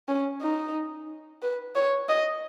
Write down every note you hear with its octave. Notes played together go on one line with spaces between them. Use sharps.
C#4
D#4
B4
C#5
D#5